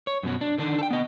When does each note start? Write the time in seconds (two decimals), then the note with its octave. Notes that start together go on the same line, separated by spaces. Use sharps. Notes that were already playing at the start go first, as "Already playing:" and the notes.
0.07 C#5
0.23 F#2 B2 F#3
0.41 D4
0.58 D3 D#3 D4
0.79 A4 G5
0.91 B3 D#5